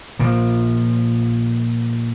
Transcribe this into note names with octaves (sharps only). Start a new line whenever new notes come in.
A#2 F3